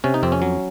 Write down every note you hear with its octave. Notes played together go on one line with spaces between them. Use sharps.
C3 C#4
D#4
F2 C4
C#4
F#3